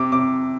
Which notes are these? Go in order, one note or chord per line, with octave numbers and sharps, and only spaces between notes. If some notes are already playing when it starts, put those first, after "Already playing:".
Already playing: C3 D6
C3 D6